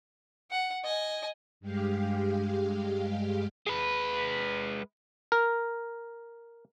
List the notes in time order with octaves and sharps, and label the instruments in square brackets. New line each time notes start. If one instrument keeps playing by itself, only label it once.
[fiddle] F#5
D#5 G#5
[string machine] G2 G#3 G4 F5
[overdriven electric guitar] G#3 B4
[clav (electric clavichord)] A#4